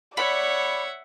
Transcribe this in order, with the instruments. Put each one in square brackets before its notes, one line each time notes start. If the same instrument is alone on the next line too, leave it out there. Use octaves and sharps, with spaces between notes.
[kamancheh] C#5 [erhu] D5 [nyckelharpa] E5 F#5 [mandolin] B5